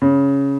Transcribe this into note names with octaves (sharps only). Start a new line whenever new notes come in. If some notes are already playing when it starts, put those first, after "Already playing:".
C#3